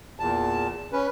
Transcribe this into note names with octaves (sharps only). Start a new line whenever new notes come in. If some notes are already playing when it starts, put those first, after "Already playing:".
E2 A#2 A5
C#4 B4